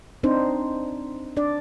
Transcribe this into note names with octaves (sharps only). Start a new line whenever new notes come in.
C4 D4 D#4 C5
D4 D5